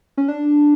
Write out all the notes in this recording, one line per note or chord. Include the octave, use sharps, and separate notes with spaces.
C#4
D4